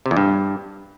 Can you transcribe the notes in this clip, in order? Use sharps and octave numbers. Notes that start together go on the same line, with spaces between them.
C3
E2
G2